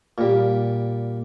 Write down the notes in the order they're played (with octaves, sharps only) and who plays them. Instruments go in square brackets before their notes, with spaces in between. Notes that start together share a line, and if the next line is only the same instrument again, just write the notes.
[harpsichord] A#2 G3